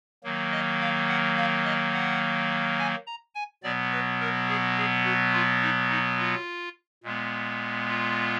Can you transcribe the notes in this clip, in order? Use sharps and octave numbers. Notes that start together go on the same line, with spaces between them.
D#3 F#3 A#3
D#5
F5
F#5
F5
D#5
F#5
G#5
A#5
G#5
B2 F#3 B3 D5
B4
A#4
G#4
G#4
F#4
F4
D#4
D#4
F4
A#2 G#3 B3
F4